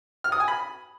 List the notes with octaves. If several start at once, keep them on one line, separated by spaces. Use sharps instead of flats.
F6
D#6
G#5
B5